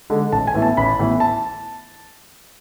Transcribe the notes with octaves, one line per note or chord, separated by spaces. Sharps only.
D3 G#3
A1 A5
G#5
A2 E3 B3
A5
A1 B5
A2 E3 B3
A5